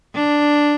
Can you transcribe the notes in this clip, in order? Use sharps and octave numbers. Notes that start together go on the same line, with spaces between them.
D4